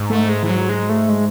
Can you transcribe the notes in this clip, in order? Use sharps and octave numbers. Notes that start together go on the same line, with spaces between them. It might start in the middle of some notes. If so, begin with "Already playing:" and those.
Already playing: G#2
A3
G#3
E3
F#3
G#3
A3
G#3